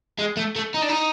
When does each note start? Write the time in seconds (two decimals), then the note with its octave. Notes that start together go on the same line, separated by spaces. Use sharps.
0.19 G#3
0.37 A3
0.56 A3
0.74 D#4
0.82 D4
0.89 D#4